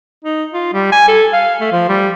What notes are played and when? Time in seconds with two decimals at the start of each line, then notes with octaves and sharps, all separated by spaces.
0.25 D#4
0.53 F4
0.74 G3
0.92 G#5
1.08 A4
1.33 F5
1.61 A3
1.72 F3
1.89 G3